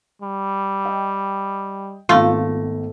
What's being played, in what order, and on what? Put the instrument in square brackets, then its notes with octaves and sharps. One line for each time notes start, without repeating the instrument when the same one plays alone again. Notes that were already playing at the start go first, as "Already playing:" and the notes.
[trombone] G3
[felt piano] D#5 G5
[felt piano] G#1 B3 A#6 [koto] A3 [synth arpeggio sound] F4